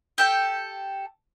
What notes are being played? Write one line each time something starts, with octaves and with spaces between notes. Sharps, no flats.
G4 A4 G5